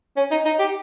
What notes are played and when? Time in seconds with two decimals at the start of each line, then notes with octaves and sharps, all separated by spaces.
0.17 C#4
0.31 D#4
0.45 D#4
0.59 G4